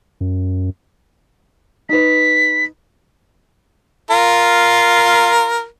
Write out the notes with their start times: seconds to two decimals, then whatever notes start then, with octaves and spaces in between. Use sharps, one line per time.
0.21 F#2
1.89 D#4 B4 B6
4.11 F4 A#4